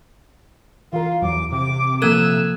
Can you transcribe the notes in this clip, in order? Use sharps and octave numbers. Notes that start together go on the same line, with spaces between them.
E3 F4 A#4 F5
E2 F#3 D6
C3 D6
F3 A#3 A4 A#4 E6 F#6 G#6